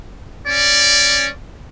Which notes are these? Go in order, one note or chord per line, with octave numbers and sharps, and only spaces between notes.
C#4 D5